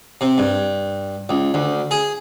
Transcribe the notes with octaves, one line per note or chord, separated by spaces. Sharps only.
C3
G2
C#2
D2
G#4